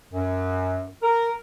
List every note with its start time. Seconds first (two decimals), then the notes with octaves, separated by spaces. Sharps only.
0.13 F#2
1.03 A#4